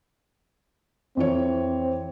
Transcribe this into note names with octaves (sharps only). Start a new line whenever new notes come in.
F2 E3 C4 C#5